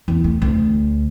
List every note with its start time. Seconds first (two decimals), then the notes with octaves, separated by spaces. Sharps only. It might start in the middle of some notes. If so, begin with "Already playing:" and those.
0.08 E2
0.24 A3
0.42 D2